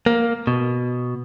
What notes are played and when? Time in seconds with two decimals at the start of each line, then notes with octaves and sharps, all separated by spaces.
0.06 A#3
0.47 B2